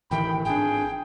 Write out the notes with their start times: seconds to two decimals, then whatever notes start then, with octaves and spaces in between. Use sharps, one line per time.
0.11 A1 D#3 E3 G5 B5
0.45 G#1 D4 G#4 G5